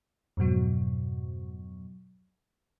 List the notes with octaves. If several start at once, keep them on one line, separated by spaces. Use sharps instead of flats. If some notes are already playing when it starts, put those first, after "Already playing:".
F2 G#2 B2 F#3